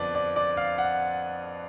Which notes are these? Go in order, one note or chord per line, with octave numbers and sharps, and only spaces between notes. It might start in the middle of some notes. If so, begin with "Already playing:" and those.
Already playing: F2 D3 F3 B3 D4 D5
D5
D5
F5
F#5